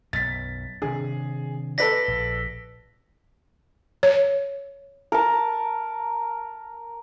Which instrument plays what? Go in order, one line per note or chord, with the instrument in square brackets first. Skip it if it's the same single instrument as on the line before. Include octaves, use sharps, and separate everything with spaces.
[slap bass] B1 F#2 B2 [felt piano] A6 B6
[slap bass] C3 D#3 D4 [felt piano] G#4
[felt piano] A4 B4 D5 [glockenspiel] A#6 B6
[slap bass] A#1
[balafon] C#5
[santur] A#4 A5